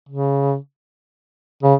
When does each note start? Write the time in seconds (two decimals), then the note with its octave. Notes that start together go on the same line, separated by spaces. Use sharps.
0.09 C#3
1.63 C#3